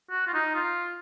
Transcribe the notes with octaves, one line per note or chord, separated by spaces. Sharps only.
F#4
F4
D#4
F4